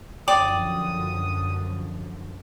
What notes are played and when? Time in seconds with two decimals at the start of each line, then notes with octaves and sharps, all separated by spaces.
0.28 F#2 D3 F3 D5 G5 D#6